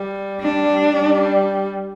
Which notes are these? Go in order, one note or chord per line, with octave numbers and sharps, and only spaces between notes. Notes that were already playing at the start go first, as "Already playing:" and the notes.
Already playing: G3
D4
G3